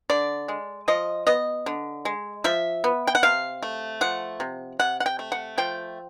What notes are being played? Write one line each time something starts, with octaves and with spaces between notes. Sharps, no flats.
D3 D5
G#3
F3 D#5
B3 D#5
D3
G#3
F3 E5
B3
G5
F#5
C3 F5
A3
F3 F#5
C3
C3 F#5
F#5
G5
A3
F#5
F3 G5